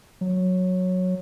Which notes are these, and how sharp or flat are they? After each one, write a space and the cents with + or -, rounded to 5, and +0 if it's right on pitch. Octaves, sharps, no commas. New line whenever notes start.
F#3 -10